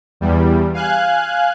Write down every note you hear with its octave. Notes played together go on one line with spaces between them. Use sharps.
E2 G3
F5 G#5 F#6